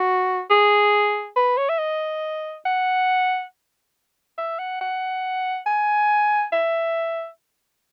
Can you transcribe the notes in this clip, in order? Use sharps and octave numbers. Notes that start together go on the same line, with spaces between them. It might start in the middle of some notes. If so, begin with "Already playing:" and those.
Already playing: F#4
G#4
B4
C#5
E5
D#5
F#5
E5
F#5
F#5
G#5
E5